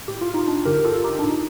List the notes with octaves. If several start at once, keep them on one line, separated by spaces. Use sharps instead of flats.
A2 G4
F4
D#4
D4 F4
G2 D3 G4 A#4
G4
F4 A4
D#4 G4
D4
A2 D#4